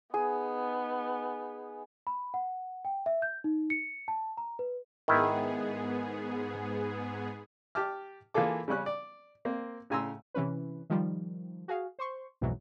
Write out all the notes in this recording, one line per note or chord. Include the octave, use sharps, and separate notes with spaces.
B3 D#4 G#4
B5
F#5
G5
E5
G6
D#4
C#7
A5
A#5
B4
G#2 D#3 B3 E4 G#4
G4 A5 D6 F6
E3 A#3 F4 G#4 A4 D6
C#3 G3 C#4 F#6
D5
A#3 C4
A2 C#3 G#5 A#5 C6 E6
C3 E3 C#4 B4
D#3 F3 G3
F#4 G#4 F5
C5 C6 C#6
B1 F2 G#2 B2 E3 F#3